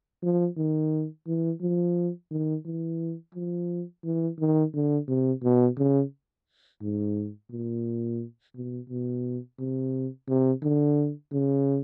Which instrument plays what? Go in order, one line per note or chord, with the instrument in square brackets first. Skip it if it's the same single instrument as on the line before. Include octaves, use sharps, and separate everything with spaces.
[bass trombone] F3
D#3
E3
F3
D#3
E3
F3
E3
D#3
D3
C3
B2
C#3
G#2
A#2
B2
B2
C3
C3
D3
C#3